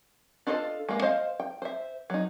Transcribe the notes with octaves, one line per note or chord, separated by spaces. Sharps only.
D4 F4 A4 C5 D#5
G#3 A#3
C5 D#5 F5
G5
C5 E5
F#3 D#4